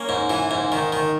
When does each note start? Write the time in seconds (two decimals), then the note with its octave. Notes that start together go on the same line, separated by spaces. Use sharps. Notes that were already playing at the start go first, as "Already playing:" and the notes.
Already playing: A#3 C#4
0.09 G#2
0.30 E3
0.51 G#2
0.72 D#3
0.93 D#3